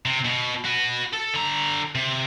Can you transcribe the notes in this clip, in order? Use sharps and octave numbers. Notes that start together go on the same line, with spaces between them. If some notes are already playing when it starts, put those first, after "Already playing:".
C3
B2
F#4 B4
A4
D3 A#5
C3